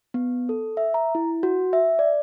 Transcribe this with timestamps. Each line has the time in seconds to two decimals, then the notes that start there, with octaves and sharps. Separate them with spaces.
0.14 B3
0.49 A4
0.77 E5
0.94 A#5
1.15 E4
1.43 F#4
1.73 E5
1.99 D5